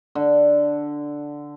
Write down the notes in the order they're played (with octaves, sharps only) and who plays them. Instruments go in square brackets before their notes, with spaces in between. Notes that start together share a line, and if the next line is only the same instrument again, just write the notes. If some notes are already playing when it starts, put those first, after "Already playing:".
[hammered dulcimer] D3